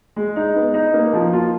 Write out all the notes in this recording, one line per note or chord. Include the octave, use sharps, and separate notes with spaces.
G#3
D#4
B3
D#4
A#3
F3
F4